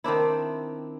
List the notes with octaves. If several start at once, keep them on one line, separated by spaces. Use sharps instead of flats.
D#3 C4 D4 E4